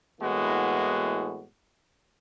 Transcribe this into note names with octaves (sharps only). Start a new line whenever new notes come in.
A2 E3 G#3 A#3 B3 F#4